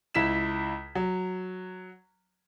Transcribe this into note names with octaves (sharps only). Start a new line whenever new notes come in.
C#2 E4 B6 E7
F#3